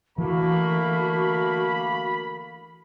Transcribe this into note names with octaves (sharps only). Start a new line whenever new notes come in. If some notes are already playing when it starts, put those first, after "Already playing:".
D3 E3 A3 A#3 F#4 B5